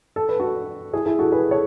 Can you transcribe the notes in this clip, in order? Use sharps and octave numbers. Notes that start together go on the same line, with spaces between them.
A4
B4
F#4 A4
E4 G#4
E4 G#4
F#4 A4
G#4 B4
A4 C#5